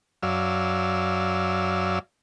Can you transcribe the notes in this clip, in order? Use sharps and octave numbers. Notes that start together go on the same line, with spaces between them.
F#2 F#3 D5 F5 E6